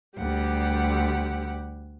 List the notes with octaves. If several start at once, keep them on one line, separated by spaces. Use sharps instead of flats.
D2 G3 G4 F#5